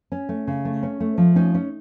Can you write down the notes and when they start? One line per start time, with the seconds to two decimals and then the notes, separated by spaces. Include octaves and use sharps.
0.12 C#4
0.29 A3
0.47 C#3
0.65 A3
0.83 C#4
1.00 A3
1.18 F3
1.35 C#4 D#4
1.54 C#4